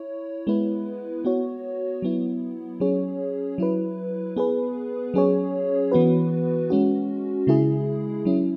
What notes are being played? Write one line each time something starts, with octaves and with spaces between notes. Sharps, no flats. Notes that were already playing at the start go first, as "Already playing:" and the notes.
Already playing: E4 C#5
G#3 B3 E4 B4
B3 F#4 C#5
F#3 B3 E4
F#3 C#4 G#4 C#5
F#3 E4 B4
B3 G#4 B4
F#3 C#4 G#4 C#5
E3 B3 F#4 B4
G#3 C#4 F#4
C#3 G#3 E4 G#4
F#3 C#4 E4